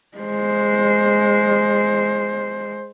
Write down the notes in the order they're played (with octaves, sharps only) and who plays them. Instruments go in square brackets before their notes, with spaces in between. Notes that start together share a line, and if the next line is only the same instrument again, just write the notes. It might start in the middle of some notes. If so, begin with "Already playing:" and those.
[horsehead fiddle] G#3 C5